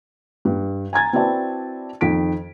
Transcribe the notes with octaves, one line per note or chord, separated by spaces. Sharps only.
G2
G#5 A#5 G#6 A6
C4 E4 F#4 B4 D5 A5
F2 D#3 B6 D7